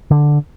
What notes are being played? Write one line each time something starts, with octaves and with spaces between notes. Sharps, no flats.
D3